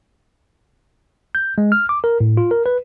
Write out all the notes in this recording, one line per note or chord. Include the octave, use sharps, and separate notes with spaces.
G6
G#3
F6
D6
A#4
A2
F4
A#4
B4